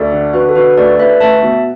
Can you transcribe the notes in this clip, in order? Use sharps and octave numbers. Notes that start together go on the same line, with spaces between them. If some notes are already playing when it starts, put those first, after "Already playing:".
Already playing: D2 A4 D5
D3
D3 F#4 B4
A4
D3 F#4 B4
D2 A4 D5
D2 B4 E5
A3 E5 A5
B2